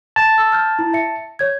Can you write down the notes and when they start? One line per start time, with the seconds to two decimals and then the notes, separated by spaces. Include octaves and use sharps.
0.16 A5
0.38 E6
0.52 F6 G6
0.79 E4
0.94 E5 C#7
1.39 C#5 G#6